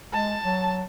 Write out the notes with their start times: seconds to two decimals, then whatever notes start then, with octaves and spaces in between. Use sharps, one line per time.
0.13 G#3 A5
0.45 F#3